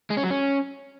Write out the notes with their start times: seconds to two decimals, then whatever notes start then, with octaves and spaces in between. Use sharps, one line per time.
0.10 G#3
0.17 C#4
0.24 F#3
0.30 C#4